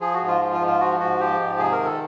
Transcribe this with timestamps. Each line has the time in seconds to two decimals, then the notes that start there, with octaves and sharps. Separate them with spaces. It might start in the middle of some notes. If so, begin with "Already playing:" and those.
0.01 F3 G#4
0.14 F#4
0.21 G#2
0.28 F4
0.41 F3
0.54 F4
0.61 G#2
0.67 F4
0.80 F3 F#4
1.00 G#2 F#4
1.20 F3 G4
1.40 G#2
1.59 C3 G#4
1.73 A#4
1.79 D#3
1.86 A4